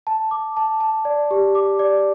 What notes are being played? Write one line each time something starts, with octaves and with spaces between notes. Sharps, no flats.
A5
D6
A5
A5
D5
G4
D6
D5